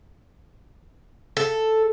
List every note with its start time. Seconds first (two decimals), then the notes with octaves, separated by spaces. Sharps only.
1.37 A4